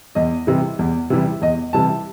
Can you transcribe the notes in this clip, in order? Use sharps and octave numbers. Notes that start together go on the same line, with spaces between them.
E2 D#5
C3 E3 G3
E2
C3 E3 G3
E2 D#5
C3 E3 G3 A5